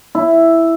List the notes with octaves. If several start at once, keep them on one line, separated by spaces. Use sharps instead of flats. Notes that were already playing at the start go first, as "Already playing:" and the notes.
E4